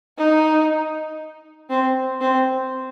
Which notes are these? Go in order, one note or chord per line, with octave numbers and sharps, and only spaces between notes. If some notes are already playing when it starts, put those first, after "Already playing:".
D#4
C4
C4